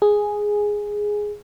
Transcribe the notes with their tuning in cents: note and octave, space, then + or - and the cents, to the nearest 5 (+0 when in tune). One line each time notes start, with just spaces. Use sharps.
G#4 +0